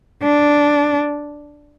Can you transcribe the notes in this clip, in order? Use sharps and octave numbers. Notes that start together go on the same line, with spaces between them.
D4